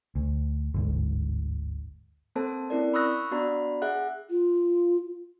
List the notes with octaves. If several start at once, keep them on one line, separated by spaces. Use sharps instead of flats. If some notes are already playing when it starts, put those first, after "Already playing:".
D2
G1 D2 G#2
A#3 C4 A4 C5 A5
C4 C#4 E4 A#4 D5
B5 C#6 D#6 E6 F#6 A#6
B3 D4 F#4 D5 A#5 B5
G#4 E5 F#5 F#6
F4